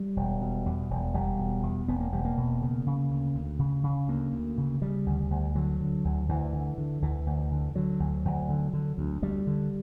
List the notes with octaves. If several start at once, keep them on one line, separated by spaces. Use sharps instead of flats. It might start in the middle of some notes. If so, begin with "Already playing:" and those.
Already playing: G3
E1
B2
E2
E1
E1 G3
B2
E2
E1 B3
A#3
E1 G3
A#3
B2
C#3
C#3
D2
D2
C#3
C#3
D2 A#3
D2
C#3
C#3 G3
D2
D2
D3 F#3
D3
D2
D2 E3
D3
D3
D2 E3
D2
D3
D3 F#3
D2
D2
D3
D3
D2
D2 G3
D3